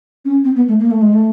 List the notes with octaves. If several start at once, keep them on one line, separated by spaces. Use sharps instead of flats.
C#4
C4
B3
A3
A#3
A3
G#3
A3